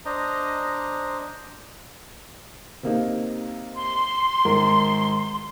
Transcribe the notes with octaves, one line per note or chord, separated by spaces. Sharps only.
D4 C5 D#5 A#5
C3 A#3 D#4
C6
G#1 A#4